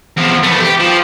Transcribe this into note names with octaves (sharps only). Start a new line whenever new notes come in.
E2 F3
A3 B3
G4
F3